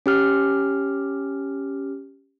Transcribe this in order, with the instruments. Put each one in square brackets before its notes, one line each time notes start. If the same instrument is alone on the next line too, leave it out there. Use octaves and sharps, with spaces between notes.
[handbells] C#4 G4 F6